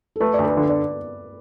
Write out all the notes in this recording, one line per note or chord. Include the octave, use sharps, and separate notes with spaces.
A4
A3 B4
D2 D5
B4
D3
D5